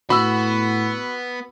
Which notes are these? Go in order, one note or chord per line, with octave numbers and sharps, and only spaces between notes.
A2 B3 F#4 B5 E6